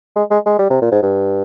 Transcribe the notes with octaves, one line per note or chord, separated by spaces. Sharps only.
G#3
G#3
G#3
G3
C3
A#2
G#2
G2